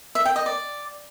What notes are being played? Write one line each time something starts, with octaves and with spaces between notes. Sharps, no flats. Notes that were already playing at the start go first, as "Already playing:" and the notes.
E5
G5
D#5
D5